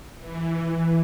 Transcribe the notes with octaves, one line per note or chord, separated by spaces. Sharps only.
E3